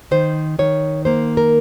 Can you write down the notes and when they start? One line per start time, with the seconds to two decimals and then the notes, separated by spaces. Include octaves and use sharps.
0.11 D#3 C5
0.59 D#3 C#5
1.05 A#3 C5
1.37 A#4